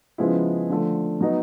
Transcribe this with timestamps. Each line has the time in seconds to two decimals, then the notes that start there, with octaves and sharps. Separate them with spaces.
0.18 C#3 F3 G#3 B3 E4
0.69 D3 F3 A3
1.21 F#3 B3 D#4